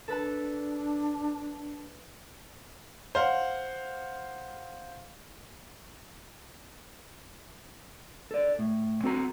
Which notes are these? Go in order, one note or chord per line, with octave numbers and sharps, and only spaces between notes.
D4 A4 B4 A5
C5 F5 F#5
A4 D5
A2
C4 F#4 A4 A#5